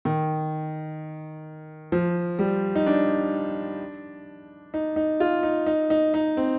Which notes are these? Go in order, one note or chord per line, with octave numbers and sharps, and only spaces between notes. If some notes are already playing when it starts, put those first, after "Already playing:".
D#3
F3
G3
D#4
D4
D#4
D#4
F4
D#4
D#4
D#4
D#4
C4